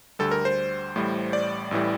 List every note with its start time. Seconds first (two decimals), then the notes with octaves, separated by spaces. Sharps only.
0.19 D2 D3 G3 A4
0.31 A#4
0.45 C5
0.96 A1 A2 G3
1.33 D5
1.71 A1 A2 E3 G3